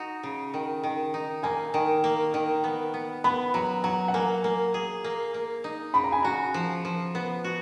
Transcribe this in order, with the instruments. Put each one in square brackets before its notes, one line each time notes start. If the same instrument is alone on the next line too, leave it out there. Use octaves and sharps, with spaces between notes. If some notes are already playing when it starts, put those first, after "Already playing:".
Already playing: [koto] D#4 F#4
C#3
D#3
D#3
D#4
[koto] A#3 [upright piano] G#5
[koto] D#3
A#3
D#3
B3
B3
[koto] B3 [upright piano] B5
[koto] F#3 [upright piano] A#5
[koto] F#3 [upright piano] A#5
[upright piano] F#5
[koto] A#3 [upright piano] G#5
[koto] A#3
G#4
A#3
A#3
D#4
[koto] C#3 [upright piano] B5
[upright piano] A#5
G#5
[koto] F#4 [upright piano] A#5
[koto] F3
F3
B3
F#4